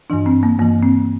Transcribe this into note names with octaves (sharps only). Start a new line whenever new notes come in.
G2 E3 D4
C4
A#3
G2 E3 A#3
C4